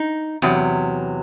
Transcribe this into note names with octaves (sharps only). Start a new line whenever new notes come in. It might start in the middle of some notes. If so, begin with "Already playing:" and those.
Already playing: D#4
E2 C3 F#3